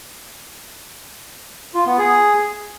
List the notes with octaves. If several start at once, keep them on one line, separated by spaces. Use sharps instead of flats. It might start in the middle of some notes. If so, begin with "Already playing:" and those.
F4
B3
G#4